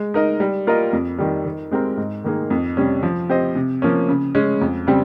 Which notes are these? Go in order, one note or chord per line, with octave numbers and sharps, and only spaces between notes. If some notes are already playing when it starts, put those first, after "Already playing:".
Already playing: G#3
D#4 A#4 D#5
G3
A#3 F4 A#4 D#5
F2
D#3 G3
D#3
G#3 C4 G4 A#4
G#2
D#3 A#3 D#4 G#4
F2
C3 G3 C#4
F3
C4 G4 C5 D#5
C3
F3 A#3 C#4
C#3
G#3 C#4
F2
C#3 G3 C4 G4